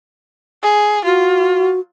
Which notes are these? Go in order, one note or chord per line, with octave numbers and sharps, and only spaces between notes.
G#4
F4 F#4